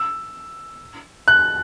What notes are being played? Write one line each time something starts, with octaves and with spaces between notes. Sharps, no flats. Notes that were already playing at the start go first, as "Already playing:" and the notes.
Already playing: E6
F#6